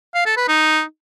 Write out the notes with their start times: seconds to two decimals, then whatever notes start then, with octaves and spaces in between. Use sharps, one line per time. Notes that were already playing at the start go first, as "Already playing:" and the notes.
0.14 F5
0.26 A4
0.37 B4
0.48 D#4